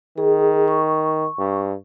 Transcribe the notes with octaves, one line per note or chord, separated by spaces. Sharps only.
D#3 G#4
C#6
G2